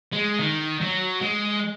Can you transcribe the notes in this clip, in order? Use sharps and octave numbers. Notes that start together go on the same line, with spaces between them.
G#3
D#3
F#3
G#3